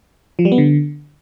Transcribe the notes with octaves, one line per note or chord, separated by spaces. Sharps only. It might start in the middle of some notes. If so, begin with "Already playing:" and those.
F3
G3
B3
D3